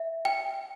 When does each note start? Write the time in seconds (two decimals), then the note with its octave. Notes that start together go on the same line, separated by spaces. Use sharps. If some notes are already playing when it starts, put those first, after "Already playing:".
Already playing: E5
0.25 G5